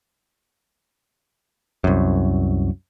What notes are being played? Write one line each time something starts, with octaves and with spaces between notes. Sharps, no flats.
C2 F#2